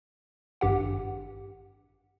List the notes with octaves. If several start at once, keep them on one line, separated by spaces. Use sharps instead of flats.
G#1 G2 G4 F#5